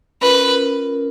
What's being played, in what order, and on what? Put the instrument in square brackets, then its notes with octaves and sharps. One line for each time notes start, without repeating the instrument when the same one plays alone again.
[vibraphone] C#4 F4 A#4 [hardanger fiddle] B4